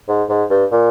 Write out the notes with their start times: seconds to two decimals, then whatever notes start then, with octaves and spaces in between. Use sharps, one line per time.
0.08 G#2
0.29 G#2
0.50 G2
0.71 A#2